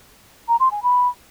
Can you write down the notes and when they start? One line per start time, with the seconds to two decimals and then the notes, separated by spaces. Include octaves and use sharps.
0.48 A#5
0.60 C6
0.71 G#5
0.83 B5